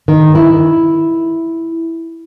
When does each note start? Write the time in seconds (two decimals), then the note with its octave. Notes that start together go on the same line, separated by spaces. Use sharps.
0.08 D#3
0.35 E4